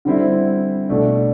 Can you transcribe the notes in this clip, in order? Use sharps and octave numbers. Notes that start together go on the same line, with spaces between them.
D3 G3 C4 E4
B2 A3 D4